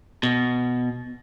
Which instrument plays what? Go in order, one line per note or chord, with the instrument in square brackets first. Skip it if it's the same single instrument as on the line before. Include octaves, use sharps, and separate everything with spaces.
[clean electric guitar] B2